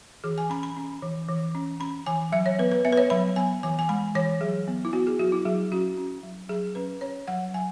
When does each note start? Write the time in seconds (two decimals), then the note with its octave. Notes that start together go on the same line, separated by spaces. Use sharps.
0.24 E3 G#4
0.38 G#5
0.50 C#4 B5
0.63 B5
0.76 C#4
1.02 E3
1.28 E3
1.55 C#4
1.80 C#4 B5
2.06 E3 G#5
2.32 F#3 E5
2.46 C#5
2.59 B3 B4
2.72 B4
2.85 B3 E5
2.92 B4
2.97 C#5
3.10 F#3 B5
3.36 B3 G#5
3.63 E3 G#5
3.79 G#5
3.89 G#3 B5
4.15 E3 C#5
4.41 F#3 G#4
4.68 B3
4.85 E4
4.93 B3 F#4
5.07 G#4
5.19 F#3 F#4
5.32 E4
5.45 F#3 G#4
5.72 C#4 F#4
5.98 C#4
6.23 F#3
6.49 F#3 G#4
6.75 C#4 B4
7.01 C#4 C#5
7.28 F#3 F#5
7.53 F#3 G#5